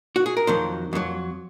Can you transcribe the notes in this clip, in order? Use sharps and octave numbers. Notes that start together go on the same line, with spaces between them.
F#4
G#4
A#4
F2 D#3 F#3 C5
F2 D#3 F#3